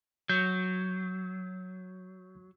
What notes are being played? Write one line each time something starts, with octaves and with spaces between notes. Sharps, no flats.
F#3 G6